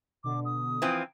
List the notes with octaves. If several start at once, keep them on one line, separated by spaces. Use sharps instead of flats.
B2 D3 D6
D#6
E3 F3 C4